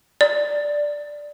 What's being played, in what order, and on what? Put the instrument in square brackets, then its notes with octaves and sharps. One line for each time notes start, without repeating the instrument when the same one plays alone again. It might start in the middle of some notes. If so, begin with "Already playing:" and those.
[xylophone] D5